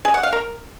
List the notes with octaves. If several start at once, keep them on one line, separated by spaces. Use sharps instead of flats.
G#4
F#5
F5
A#4